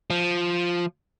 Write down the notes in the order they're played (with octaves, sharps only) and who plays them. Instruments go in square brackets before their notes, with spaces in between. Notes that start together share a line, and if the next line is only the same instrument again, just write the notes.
[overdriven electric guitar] F3